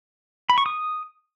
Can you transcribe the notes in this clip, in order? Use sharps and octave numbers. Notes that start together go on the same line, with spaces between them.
B5
C#6
D#6